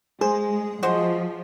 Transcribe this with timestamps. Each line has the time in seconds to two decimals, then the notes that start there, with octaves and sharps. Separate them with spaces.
0.21 G#3 G#4 C5
0.83 F3 F#4 C5 D#5